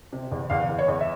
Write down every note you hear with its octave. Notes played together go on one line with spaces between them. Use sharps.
C3
E2
E2 F5
E2
C#5
E2
E5